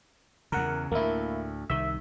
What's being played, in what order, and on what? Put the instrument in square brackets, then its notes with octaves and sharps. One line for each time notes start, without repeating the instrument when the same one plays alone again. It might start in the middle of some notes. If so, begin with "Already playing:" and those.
[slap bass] E2 C#3 [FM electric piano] A#4 F#5
[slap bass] D2 A2 [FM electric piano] A#3 E4
[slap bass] C2 D#3 [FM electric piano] E5